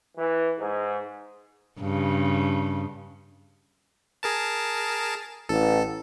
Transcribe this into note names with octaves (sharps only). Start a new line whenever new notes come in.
E3
G#2
G2 C#3
G#4 A#4 A5
A1 A4